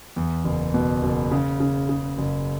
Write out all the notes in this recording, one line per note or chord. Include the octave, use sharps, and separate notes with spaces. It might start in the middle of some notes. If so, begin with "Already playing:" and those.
E2
F#1
B2
F#1
C#3
C#3
C#3
F#1